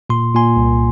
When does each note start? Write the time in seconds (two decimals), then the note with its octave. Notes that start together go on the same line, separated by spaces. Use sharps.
0.10 A#2 C6
0.34 A#2 G#5 C6
0.56 C2